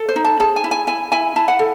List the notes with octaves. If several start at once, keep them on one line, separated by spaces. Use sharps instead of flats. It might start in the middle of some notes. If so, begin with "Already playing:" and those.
Already playing: A4
C5
D#4
A5
G#4 A5
G#5
E4
G#5
E4 G#5
E4 G#5
E4 A5
F#5
A4